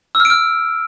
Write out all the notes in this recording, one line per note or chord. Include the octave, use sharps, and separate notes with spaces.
E6
F6
D7
F6